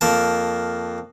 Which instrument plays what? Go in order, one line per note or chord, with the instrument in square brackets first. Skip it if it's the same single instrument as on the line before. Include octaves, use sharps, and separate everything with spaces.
[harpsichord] F2 A#3 A5